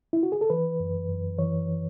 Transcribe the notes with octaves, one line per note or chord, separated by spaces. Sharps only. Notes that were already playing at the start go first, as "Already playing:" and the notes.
E4
F#4
G#4
A4
E3 B4
F#2
F#2
E3 C#5
E3